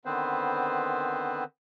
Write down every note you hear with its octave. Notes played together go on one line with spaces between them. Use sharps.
D3 D#3 B3 C4 B4 C5